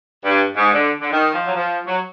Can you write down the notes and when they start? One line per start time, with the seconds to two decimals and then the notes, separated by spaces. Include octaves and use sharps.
0.25 G2
0.57 G#2
0.73 D3
1.01 D3
1.12 D#3
1.33 F3
1.46 F#3
1.56 F3
1.87 F#3